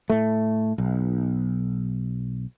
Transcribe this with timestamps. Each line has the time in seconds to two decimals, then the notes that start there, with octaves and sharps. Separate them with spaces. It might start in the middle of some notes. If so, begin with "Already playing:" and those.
0.10 A2 A3
0.78 B1